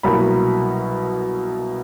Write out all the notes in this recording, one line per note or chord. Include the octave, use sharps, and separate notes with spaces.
C2 B2 F#3 A#3 B5